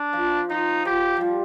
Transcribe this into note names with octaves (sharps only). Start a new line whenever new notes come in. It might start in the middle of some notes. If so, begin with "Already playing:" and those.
Already playing: D4
F3
F3 D#4
F3 G4
F3 G3